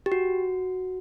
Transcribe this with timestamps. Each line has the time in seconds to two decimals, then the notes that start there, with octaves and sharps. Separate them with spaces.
0.06 G4
0.12 F#4